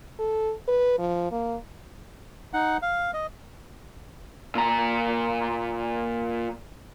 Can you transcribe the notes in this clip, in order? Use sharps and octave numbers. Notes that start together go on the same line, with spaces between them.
A4
B4
F3
A#3
D#4 F#5
F5
D#5
A#2 A#5